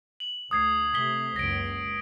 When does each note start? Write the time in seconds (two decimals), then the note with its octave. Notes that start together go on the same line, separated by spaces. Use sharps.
0.20 F#7
0.51 D2 D#6 G#6 C7
0.93 C3 A3 D#6 B6 G7
1.36 F#1 C#2 C#3 A#6 D7